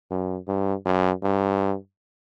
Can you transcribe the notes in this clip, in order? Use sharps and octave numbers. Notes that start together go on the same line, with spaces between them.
F#2
G2
F#2
G2